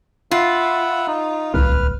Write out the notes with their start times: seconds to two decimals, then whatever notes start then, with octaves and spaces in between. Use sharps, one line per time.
0.31 F4 E5 F#5 B5
1.08 D#4
1.54 D1 C2 B4 F6